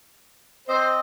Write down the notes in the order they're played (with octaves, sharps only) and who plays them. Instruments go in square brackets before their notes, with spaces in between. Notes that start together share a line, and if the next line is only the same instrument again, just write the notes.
[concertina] C4 D#5 [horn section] C5